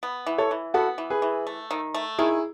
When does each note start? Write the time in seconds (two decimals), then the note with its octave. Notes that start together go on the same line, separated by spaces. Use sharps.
0.03 B3
0.26 E3
0.38 A4 C#5
0.51 E3
0.74 B3 F#4 A4
0.98 E3
1.10 G#4 B4
1.22 E3
1.47 A3
1.71 D#3
1.94 A3
2.18 D#3 E4 G#4